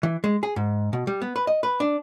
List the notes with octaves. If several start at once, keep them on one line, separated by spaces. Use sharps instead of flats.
E3
G#3
G#4
G#2
B2
G3
B3
B4
D#5
B4
D4